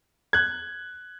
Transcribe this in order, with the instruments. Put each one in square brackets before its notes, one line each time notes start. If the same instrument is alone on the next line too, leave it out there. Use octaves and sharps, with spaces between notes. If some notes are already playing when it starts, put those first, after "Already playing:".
[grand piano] F#6 G#6